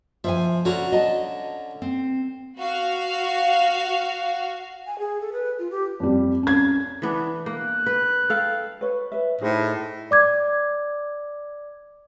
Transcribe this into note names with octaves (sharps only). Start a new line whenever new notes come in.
F3 E5 F5 G#5
D3 C#4 F#4 A#5
D#5 A5
C4
F#4 F5
G#5
G#4
A4
B4
F4
G4
F2 G3
C#4 G#6
E3 B3 D4
A#3 F#6
B4
A4 F5 G5
B4 C#5
B4 E5
A2 D#4 G#4 C5
D5 D6 G#6